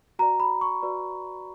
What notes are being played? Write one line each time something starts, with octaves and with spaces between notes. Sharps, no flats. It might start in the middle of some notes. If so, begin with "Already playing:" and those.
F#4 B4 D5 A#5
B5
C#6
F#4 B4 D5